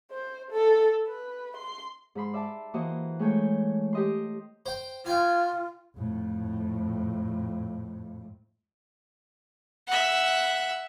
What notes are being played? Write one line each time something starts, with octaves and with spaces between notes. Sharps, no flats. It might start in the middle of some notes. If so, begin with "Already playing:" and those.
C5
A4
B4
C6
G#2 G#3 B5 C6
D5 E5 A5
E3 A#3 F#4 C5 D#5
G#3 A3 C#5 G5 G#5
G4 D#5 C6
C5 G5
F4 G5 G#5
F2 A2
E5 F#5